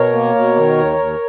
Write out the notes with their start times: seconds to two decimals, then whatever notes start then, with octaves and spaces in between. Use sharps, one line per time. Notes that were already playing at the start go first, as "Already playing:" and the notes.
Already playing: B2 A#4 C#5
0.13 A#3
0.35 B2
0.56 D#3
0.77 D#2
0.98 D#2